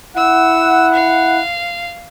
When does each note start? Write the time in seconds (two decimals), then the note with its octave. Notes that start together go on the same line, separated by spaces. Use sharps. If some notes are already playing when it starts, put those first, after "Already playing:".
0.16 E4 F#5 E6
0.93 F5